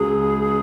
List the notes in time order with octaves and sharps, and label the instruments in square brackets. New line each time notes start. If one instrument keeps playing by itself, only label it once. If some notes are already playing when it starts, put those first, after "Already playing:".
Already playing: [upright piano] C#2 C#3 F#3 [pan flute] G#4